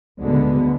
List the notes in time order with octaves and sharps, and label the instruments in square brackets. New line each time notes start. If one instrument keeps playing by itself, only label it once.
[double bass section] D2 D3 G#3 B3